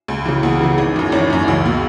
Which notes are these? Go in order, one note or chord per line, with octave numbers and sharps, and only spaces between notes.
C#2
C#3 E3
C#2 B3
C#3 E3
G#1
F#2 E3
G#1 C#4
F#2 E3
C#2
B2